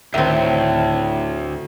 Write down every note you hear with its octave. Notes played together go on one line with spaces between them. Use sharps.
D2 A2 D#3 C4 E5